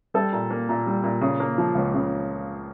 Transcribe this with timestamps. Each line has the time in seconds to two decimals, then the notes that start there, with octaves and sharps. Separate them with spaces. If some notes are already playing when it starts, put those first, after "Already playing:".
0.14 G3 A4
0.33 A#2
0.50 A#3
0.69 A#2
0.87 G3
1.03 A#2
1.21 C#3
1.40 A#3
1.58 F3
1.75 C#2
1.94 C#3